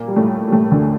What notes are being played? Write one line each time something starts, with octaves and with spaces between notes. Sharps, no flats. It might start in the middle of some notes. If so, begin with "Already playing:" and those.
Already playing: A#2 A#3
G3
A2 A3
G3
A2 A3
D2 D3